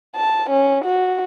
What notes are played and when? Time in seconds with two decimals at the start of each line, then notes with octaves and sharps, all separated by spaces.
0.16 A5
0.50 C#4
0.85 F#4